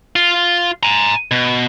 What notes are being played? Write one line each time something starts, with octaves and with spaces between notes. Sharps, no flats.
F4
G#5 A#5
B2